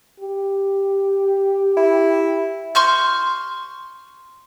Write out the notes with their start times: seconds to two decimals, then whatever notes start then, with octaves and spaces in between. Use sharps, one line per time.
0.20 G4
1.77 E4
2.75 C6 C#6 F6 G6